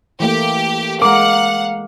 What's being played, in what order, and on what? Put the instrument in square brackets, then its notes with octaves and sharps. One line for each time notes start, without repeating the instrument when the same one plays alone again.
[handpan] E3 A3 A#3 [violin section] G4
[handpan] G#3 A#4 [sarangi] F5 [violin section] F#5 [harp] D6